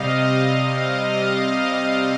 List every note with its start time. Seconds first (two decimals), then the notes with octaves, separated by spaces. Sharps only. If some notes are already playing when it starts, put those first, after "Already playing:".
Already playing: C3 G3 D#5 F5
0.80 D#5
1.19 F5